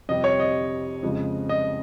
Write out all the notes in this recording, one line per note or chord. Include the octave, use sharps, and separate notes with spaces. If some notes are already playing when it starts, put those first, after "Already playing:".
F2 C3 G3 D#5
C#5
D#5
F2 C#3 G#3
D#5